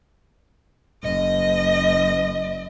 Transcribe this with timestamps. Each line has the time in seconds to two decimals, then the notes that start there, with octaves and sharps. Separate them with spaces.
1.03 F#1 D#5